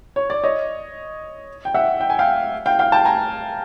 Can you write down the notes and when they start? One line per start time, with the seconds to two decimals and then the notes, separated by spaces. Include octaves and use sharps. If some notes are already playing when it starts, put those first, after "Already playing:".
0.16 C#5
0.30 D5
0.44 C#5 D#5
1.65 G5
1.74 E5 F#5
2.01 G5
2.10 G#5
2.19 F5 G5
2.66 F5 G5
2.79 F5 G5
2.92 G5 A5
3.05 G#5 A#5